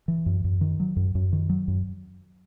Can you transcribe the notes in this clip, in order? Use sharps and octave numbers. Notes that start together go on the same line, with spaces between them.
E3
F#2
F#2
D#3
F#3
F#2
F#2
D#3
F#3
F#2